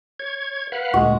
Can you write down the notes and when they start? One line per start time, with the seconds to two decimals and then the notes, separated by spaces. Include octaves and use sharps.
0.19 C#5 G#6
0.72 B4 F5 F#5
0.94 D2 A#2 G#3 F#4